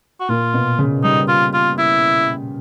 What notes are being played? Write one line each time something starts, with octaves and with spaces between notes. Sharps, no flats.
F#4
A#2 F4
B2
C#3
G3 D#4
F4
F4
E4